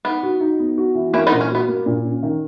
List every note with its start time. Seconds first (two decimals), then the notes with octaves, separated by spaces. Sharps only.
0.05 B3 D#4
0.23 F#4
0.41 D#4
0.59 B3
0.78 F#4
0.95 E3
1.13 A#3 C#4 E4
1.27 B3 D#4
1.32 A#2
1.41 C#4
1.50 B3 F#4
1.68 A#3
1.86 A#2
2.04 C#4
2.23 D#3